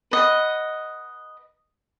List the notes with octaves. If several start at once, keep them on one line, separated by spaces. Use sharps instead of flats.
B4 D#5 F#5